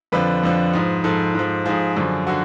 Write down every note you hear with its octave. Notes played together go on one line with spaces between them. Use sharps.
F2 D3 F3 B4
F2 D3 F3
G#2 F3
G#2 F3 A4
G#2 F3
G#2 F3 G#4
F#2 D3 F3
D3 F#4